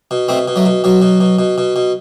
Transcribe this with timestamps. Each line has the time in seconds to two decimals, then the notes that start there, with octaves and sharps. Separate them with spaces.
0.11 B2
0.28 B2 A3 C4
0.48 B2
0.56 F#3 A3
0.65 B2
0.84 B2 F#3
1.02 B2
1.21 B2
1.39 B2
1.58 B2
1.76 B2